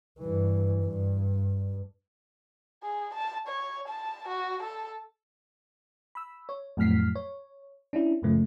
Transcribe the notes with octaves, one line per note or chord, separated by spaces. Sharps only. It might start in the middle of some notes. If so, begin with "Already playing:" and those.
G2 E3
G2
G#4
A5
C#5
A5
F#4
A4
B5 E6
C#5
F2 A2 F#3 F6 B6 C7
C#5
C#4 D4 E4
F#2 A#2 C#3 F3 A3 A#3